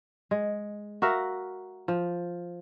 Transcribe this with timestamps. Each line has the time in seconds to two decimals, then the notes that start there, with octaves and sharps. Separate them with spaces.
0.31 G#3
1.02 F#4 A#4 E5 F5
1.88 F3